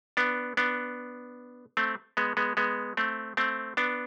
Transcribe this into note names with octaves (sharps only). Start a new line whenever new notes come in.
B3 D4
B3 D4
A3 C4
G#3 B3
G#3 B3
G#3 B3
A3 C4
A3 C4
B3 D4